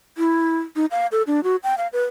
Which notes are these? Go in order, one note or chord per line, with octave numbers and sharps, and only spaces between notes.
E4
D#4
F5
A4
D4
F#4
G5
F5
B4